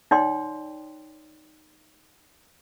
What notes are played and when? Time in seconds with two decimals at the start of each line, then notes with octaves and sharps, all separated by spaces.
0.11 D#4 C#5 D5 G5 C6